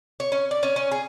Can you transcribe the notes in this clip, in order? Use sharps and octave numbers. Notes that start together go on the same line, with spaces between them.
C#5
C#4
D5
C#4
C#4
G#4